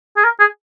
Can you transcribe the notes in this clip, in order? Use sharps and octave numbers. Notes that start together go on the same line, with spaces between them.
G#4
A#4
G#4